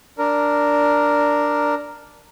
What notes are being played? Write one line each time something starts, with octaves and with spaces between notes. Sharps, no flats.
D4 A#4